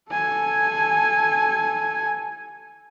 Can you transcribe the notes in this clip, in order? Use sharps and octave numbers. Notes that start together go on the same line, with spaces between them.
A4 G#5